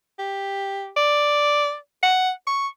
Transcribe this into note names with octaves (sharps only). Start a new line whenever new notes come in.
G4
D5
F#5
C#6